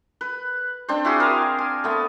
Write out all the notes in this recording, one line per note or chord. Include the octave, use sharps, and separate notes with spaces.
B4
C4 D4 C5
E4 F#4 G#4
A#4 C5 F5
G#5
A3 B3